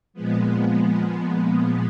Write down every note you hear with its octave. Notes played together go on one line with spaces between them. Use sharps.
A#2 F3 G#3 B3